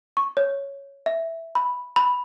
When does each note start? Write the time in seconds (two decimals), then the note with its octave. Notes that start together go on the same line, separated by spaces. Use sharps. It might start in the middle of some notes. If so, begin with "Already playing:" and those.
0.17 C#6
0.37 C#5
1.06 E5
1.55 B5
1.96 B5